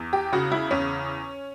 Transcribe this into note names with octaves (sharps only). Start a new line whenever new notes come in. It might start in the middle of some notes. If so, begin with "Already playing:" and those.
Already playing: E2
G4
C#3 F#4
E4
E2 C#4